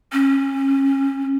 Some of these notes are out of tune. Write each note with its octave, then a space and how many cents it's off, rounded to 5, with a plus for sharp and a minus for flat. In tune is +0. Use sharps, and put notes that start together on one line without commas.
C#4 -25